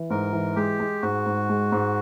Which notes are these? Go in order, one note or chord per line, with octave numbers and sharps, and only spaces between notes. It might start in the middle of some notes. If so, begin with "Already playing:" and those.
Already playing: E3
G#2 A#4
E3
G#3 G4
G#3
G#2 F#4
G#2
G#3
G#2